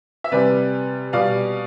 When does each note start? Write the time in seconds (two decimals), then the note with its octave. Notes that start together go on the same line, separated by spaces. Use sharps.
0.24 E5
0.32 C3 E3 G3 B4 D5
1.13 B2 G3 D5 F5